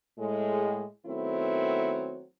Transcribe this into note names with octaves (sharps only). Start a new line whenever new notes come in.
A2 G#3
D#3 F#3 A3 B3 C4 E4